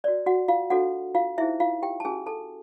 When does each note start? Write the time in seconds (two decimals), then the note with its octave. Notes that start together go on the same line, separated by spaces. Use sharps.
0.04 F#4 A#4 C#5 D5
0.26 F#4 F#5
0.48 F4 F5
0.70 D4 F4 F#4 A4 C#5 F#5
1.15 F4 F5
1.38 D#4 E4 G#4 C5 E5
1.60 F4 F5
1.83 G4 G5
2.00 A5
2.05 C#4 F#4 G#4 A#4 G#5
2.26 A4 A5